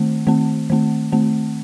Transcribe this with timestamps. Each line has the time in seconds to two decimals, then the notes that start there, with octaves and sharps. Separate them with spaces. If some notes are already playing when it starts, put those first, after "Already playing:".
Already playing: D#3 A3 C4
0.27 D#3 A3 C4
0.70 D#3 A3 C4
1.12 D#3 A3 C4